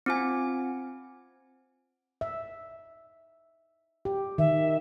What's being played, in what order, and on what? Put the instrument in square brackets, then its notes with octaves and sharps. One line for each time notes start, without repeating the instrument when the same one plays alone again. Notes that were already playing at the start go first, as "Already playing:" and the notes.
[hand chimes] C4 F4 G#5
[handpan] E5
G4
[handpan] D#3 [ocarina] E5